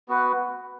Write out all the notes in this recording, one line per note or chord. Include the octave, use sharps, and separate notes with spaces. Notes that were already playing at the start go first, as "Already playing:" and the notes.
B3 F#4 B4 F#5